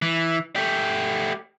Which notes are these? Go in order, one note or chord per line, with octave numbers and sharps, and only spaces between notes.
E3
A3 G4